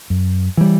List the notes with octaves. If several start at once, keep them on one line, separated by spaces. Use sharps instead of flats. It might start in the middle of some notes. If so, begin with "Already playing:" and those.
F#2
E3 G3